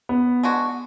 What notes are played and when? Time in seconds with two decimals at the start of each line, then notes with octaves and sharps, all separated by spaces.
0.09 B3
0.43 G#3 D4 F#4